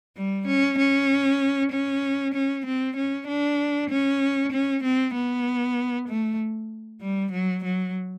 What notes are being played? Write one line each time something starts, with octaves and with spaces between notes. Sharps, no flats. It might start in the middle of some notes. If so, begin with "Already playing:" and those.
G3
C#4
C#4
C#4
C#4
C4
C#4
D4
C#4
C#4
C4
B3
A3
G3
F#3
F#3